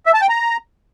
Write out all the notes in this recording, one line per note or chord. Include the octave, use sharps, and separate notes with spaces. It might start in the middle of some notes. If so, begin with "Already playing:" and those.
E5
A5
G5
A#5